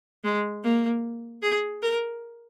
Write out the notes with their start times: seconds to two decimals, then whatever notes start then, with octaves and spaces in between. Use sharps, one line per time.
0.24 G#3
0.63 A#3
1.42 G#4
1.82 A#4